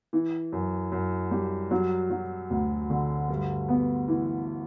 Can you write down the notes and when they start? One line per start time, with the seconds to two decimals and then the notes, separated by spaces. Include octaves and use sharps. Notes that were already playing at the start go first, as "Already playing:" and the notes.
0.13 E3
0.52 F#2
0.92 F#2
1.31 G3
1.71 F#3
2.10 F#3
2.50 D2
2.90 D3
3.29 G2
3.69 B3
4.08 E3